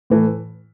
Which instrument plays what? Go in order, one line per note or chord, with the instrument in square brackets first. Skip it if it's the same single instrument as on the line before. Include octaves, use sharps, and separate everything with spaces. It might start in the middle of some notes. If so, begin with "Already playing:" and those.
[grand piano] A2 E3 A3